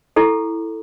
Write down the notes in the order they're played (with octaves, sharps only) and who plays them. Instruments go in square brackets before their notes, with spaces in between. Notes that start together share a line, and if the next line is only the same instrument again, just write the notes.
[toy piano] E4 G4 A4